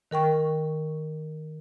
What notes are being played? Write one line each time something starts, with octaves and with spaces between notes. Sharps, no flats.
D#3 A#4 G5 C#6